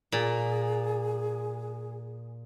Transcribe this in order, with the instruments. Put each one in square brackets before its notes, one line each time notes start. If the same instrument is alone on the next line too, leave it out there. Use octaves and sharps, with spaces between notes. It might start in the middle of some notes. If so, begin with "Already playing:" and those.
[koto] A#2 [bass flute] G#4